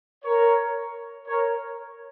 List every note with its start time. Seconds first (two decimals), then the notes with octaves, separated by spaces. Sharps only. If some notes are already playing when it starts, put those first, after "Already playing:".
0.25 A#4 C#5
1.28 A#4 C#5